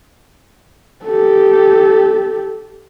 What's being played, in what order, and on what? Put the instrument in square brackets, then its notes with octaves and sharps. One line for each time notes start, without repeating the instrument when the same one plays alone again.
[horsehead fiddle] G4 A4